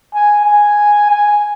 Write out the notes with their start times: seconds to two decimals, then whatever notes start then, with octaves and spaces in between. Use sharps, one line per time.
0.14 G#5
0.45 G#5
1.10 G#5